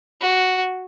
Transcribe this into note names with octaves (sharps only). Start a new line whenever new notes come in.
F#4